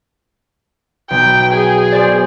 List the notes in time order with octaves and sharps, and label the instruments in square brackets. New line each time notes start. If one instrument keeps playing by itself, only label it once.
[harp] B1 [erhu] G5
[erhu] G#4
[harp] C5 D5